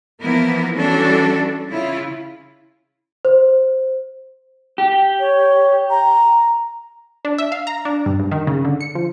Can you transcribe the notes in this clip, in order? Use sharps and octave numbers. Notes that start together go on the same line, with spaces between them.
E3 F3 A#3 B3 E4 A#4
E3 G3 C#4 D4 F#4 A4
C#3 E4 F4
C5
G4
C#5
A#5
D4
E5
F5
A#5
D4
G2
G2
D#3
C#3
D3
C#7
F3